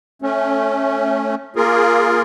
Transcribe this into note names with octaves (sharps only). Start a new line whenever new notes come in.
A3 C#4
A#3 F4 G#4 A#4